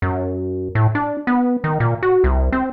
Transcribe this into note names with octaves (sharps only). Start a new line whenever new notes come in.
F#2
A2
D4
B3
D#3
A#2
F#4
C2
C4